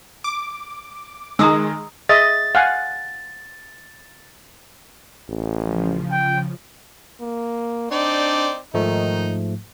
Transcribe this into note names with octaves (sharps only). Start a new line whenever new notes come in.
D6
D#3 G#3 A#5 D#6 E6
G#4 D#5 E5 A6
F5 F#5 G#5
A1
C#3 F3
G5
A#3
C4 D4 D#4 D5
G#2 D#3 F3 A3 D#4